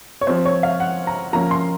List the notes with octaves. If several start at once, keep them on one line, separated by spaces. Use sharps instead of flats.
C#5
F3 C4 C5
C#5
F5
F#5
A#5
F3 A#3 C#4 A#5
C6